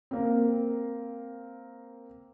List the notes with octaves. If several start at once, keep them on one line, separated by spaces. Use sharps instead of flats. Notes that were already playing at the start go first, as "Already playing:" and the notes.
A#3 C4